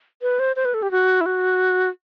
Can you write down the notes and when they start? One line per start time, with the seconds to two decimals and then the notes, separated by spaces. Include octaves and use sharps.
0.22 B4
0.39 C5
0.56 C5
0.65 B4
0.74 A4
0.82 G4
0.91 F#4
1.21 E4
1.26 F#4